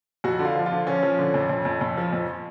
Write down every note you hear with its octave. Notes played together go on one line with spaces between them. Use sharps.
F2 F#4
D3
F4
F3
F4
D3
F3 C#4
F3
D3
F2
F2
F2
F2
F3
F2